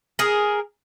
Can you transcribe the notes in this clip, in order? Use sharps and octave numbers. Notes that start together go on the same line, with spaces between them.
G#4 A#4